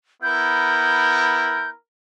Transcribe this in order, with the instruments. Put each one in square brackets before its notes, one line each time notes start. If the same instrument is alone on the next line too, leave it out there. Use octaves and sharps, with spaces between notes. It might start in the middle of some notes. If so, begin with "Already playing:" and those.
[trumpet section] B3 E4 A#4 [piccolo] G6